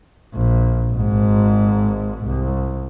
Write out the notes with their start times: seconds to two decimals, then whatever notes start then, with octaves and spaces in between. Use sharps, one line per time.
0.34 A#1
0.91 G#1 G#2
2.24 C2